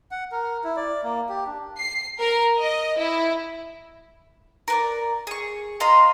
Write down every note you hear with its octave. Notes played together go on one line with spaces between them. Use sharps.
F#5
A#4
E4
D5
A#3
G4
D4
C7
A#4
D#5
E4
A#4 B4 D5
G#4 C#6
F4 D#5 A#5 C6